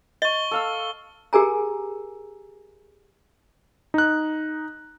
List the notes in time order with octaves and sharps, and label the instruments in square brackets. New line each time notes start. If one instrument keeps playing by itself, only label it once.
[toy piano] D#5 [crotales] C#6 G7
[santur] A4 F5 E6
[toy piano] G4 G#4 A#4 G#5 A#5
[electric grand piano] D#4 F#6